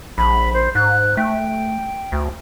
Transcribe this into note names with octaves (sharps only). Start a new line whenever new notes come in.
A#1 B5
C5
G#2 F#6
A3 G5
D2